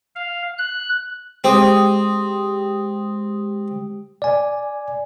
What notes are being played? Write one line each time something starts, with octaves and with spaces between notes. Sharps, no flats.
F5
F#6
G#3 C4 G4 D#6
D5 G#5